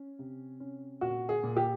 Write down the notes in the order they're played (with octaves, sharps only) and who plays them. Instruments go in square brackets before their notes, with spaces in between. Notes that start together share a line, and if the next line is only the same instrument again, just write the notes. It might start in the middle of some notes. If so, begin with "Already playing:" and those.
Already playing: [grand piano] C#4
C3
C#4
[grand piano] A#2 [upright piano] F#4
[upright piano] G#4
[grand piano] A#2
[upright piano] G4